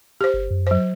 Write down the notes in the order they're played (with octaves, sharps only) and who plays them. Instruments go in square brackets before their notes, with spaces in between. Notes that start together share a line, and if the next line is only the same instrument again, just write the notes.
[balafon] G4 C5
[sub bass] G1
F#2
[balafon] F#3 C5